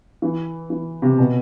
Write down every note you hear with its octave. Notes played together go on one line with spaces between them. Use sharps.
E3
E3
C3
B2